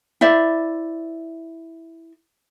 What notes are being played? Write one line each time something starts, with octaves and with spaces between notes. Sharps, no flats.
E4 C5 D5 E5